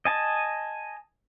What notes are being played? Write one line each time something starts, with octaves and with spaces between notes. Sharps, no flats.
D#5 G#5 A5